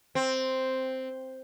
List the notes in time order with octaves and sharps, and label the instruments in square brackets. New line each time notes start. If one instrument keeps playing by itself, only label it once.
[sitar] C4